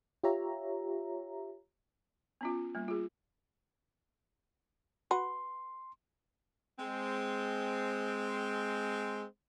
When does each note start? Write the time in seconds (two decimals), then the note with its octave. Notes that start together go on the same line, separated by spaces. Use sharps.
0.23 F4 G4 C#5 E5 A#5
2.41 B3 C#4 F4
2.75 G3 A#3
2.88 F4 G#4
5.11 F#4 B4 C6
6.79 G#3 C4